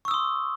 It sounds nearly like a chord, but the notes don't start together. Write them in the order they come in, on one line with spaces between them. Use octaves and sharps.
C#6 E6 D#6 C6